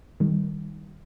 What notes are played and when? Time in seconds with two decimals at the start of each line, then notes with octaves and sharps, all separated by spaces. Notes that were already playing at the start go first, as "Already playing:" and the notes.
0.20 D#3 G3